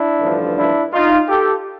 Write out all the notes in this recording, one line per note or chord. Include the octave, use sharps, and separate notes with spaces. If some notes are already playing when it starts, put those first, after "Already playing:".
Already playing: D4 E4
A1 G2 D3 F3
D4 E4
D#4 F4
G4 A4